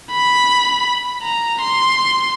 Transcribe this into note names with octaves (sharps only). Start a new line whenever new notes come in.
B5
A#5
C6